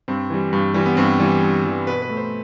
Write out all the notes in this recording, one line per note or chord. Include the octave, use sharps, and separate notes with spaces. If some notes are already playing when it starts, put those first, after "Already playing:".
G2 C4
E3 G3
G2
E3 G3
B3
G2 C4
E3 G3
G2
E3 G3
B2 B4
B4
A3
C5